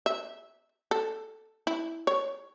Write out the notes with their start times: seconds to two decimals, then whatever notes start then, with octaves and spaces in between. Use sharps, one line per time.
0.06 E5
0.91 A4
1.67 E4
2.07 C#5